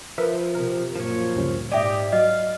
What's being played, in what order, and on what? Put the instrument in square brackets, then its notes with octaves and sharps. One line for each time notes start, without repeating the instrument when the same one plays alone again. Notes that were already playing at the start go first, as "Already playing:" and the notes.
[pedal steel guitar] F3 [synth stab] A#4 B4 E5
[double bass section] C3 [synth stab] A#4
[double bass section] F#2 A#2 [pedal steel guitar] F3 C#5
[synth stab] D2 G2 C#3
[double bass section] G#2 [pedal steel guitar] G4 [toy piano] D5 E5 [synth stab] G5 D6 D#6
[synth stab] F#3 [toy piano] D#5 [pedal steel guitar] F5